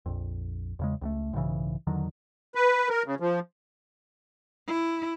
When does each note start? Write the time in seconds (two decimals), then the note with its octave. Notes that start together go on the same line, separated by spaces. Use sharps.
0.06 A#1 F2
0.79 E2 C#3 G#3
1.01 C#2 F#3 A3
1.33 B1 G#2 C#3 E3
1.87 E2 D3 D#3 F#3
2.55 B4
2.89 A#4
3.06 C#3
3.20 F3
4.67 E4